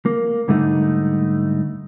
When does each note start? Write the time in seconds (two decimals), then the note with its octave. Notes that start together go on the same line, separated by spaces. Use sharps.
0.06 A#3
0.48 G#2 D3 G3 A3 B3 D#4